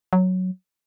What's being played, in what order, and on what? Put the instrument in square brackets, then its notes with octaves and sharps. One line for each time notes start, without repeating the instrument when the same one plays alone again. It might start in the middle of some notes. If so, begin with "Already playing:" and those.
[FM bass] F#3